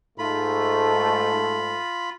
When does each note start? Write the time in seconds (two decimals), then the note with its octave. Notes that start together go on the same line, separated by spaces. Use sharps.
0.19 G#2 A3 F4 B5